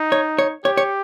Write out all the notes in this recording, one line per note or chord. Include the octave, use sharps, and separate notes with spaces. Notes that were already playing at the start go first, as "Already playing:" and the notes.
Already playing: D#4
C#5
C#5
G4 C#5
C#5